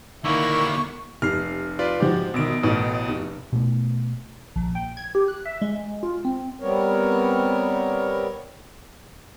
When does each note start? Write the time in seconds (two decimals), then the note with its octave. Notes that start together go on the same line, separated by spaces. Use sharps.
0.24 D3 D#3 A#3 E4 C#6
1.22 F1 F6 C7
1.79 F4 B4 D5
2.00 G#2 F3 F#4 G4
2.34 G#1 B2 D#3 D7
2.63 A1 B2 A3
3.08 F1
3.53 B2 A3
4.56 A#1
4.75 G5
4.97 G#6
5.15 G4
5.28 F#6
5.45 E5
5.62 G#3
6.03 F4
6.25 C4
6.61 G3 B3 C4 A#4 C#5